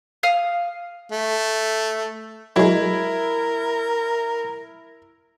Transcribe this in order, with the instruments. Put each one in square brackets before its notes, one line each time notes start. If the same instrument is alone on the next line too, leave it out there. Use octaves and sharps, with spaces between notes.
[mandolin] F5 D#6 F6
[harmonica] A3
[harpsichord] F#3 G#3 [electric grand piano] E4 [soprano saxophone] A#4